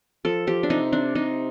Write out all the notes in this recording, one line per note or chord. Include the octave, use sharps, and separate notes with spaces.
F3 A4
F3 G4
D4
C3 D#4
C4 D4
C3 D#4